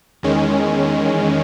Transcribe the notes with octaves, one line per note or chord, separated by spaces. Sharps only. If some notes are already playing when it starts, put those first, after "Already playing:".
E2 D#3 G#3 C#4